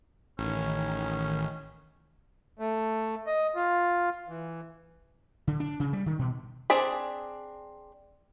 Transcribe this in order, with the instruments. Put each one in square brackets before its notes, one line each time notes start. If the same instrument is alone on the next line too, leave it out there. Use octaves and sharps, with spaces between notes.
[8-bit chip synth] A1 [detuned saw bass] D#3 [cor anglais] C#4
[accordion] A3
D#5
F4
E3
[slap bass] D3
D4
C#3
G3
D#3
B2
[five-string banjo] C4 D4 G#4 D5 B5